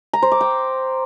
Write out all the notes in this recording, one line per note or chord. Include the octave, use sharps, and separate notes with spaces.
A#5
C5
D6
G5